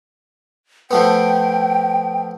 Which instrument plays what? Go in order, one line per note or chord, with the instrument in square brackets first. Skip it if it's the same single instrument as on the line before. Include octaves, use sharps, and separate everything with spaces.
[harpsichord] F3 A3 B3 [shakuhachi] G5